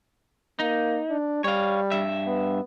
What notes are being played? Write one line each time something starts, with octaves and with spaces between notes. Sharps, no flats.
A#3 D#4
D4
G3 C#5 F5
G2 E5
B3